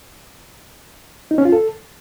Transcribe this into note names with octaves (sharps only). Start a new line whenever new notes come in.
D#4
C#4
F4
A4